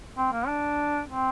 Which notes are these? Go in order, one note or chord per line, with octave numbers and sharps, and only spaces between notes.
C4
A#3
D4
C4